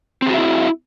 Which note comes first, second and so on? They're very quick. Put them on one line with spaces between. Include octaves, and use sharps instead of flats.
C4 G#4 F#4 E5 E4